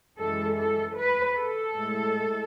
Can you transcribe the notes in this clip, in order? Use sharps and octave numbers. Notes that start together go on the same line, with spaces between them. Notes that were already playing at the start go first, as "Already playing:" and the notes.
F#2 E3 G#3 A4
A4
B4
A4
A2 G#3